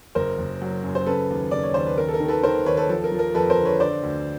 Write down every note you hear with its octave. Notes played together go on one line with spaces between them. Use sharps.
F#1 A#4 C5
F#1
F#3
F#2
C5
C#3 A4 B4
D#2
C#3 D5
C#5
D#2 C5
B4
D#2 A#4
A4
A#4
D#3
A4 B4
D#3 A#4 C5
D#2 B4 C#5
A4 B4
F3 A4
A#4
F3
A#4
F2 A4 B4
A#4 C5
D3
B4 C#5
D3 C5 D5
D2